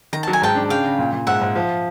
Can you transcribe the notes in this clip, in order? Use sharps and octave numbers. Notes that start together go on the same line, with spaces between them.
D#3 A#5
F#3 A5
G#5
G#2 G5 A5
D4
C#3 F5 G5
C#3
A#2
A#2
G#2 E5 F#5
G#2
F3